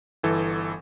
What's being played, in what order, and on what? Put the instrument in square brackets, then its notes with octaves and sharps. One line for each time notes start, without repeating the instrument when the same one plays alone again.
[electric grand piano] G1 E3 A4